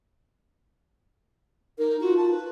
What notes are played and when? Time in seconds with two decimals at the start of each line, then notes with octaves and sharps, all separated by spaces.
1.78 D#4 A#4
2.01 F4 F#4
2.17 A5
2.31 B4